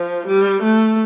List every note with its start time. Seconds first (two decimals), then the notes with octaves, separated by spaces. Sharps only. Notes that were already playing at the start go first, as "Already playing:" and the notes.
Already playing: F3
0.27 G3
0.62 A3